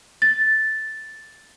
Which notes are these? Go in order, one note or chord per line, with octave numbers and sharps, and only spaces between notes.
A6